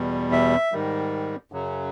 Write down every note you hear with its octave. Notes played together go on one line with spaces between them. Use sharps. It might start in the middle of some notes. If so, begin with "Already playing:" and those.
Already playing: E2 B2 G3
E5
G#2 D#3 G3
F#2 C#3 F#3